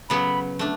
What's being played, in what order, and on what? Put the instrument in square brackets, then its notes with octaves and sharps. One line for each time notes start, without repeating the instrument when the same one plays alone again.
[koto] C#3 F#3 B3 [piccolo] B5
[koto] A3 D4